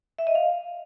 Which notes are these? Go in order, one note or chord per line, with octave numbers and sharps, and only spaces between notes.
E5
D#5
F5